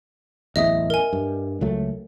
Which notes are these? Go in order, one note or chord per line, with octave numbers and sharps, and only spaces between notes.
D1 A1 E2 D#5 E5 D#6
A#4 G#5
G2
C#2 F#3 A3